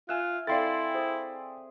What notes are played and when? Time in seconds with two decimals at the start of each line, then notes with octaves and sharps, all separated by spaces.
0.09 F4 E5 G#5 F#6 E7
0.47 C4 E4 A4 D5 F5 C6 A6
0.95 G#4 C5